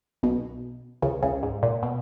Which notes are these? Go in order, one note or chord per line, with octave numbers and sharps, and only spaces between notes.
B1 B2
C#2 C#3
C#2 C#3
G#2
A#2
B2